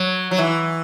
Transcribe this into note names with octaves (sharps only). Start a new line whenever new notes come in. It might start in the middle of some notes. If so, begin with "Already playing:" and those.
Already playing: F#3
F#3
E3